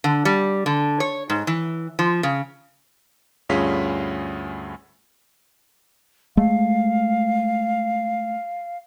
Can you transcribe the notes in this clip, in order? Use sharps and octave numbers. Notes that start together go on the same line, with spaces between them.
D3
G3
D3
C#5
G#2
E3
F3
C#3
D2 G2 C#4 F4 G#4 B6
G#3 A3 F5